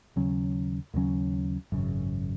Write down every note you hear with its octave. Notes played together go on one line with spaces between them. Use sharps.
D#2 C#3 F#3 C#4
D#2 C#3 F#3 C#4
G#1 F#2 C#3